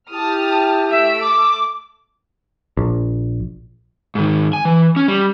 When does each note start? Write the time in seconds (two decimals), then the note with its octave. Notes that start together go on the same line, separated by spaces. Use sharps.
0.11 E4 G4 A5 D#6 F6
0.91 A3 E5 E6 D7
1.21 D6
2.77 A#1
4.15 G#2 D#3
4.53 G#5
4.65 E3
4.96 C#4
5.08 G3